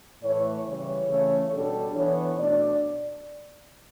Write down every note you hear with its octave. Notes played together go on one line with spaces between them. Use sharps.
A2 E3 A3 C#5
C#3 E3 G3 C#5
C#3 E3 A3 C#4
B2 G3 D4 A4
E3 B3 D4 C#5
B2 A3 D4 D5